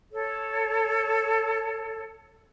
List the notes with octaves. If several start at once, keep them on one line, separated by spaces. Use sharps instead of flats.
A4 C#5